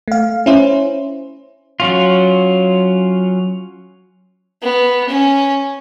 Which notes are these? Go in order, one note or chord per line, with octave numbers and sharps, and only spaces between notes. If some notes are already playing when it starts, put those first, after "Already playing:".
A3 F5
C#4 E4 C5
F#3 C#4 F4
B3
C#4